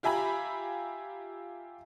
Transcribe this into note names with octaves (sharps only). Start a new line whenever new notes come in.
F4 G4 E5 G#5 A#5 B5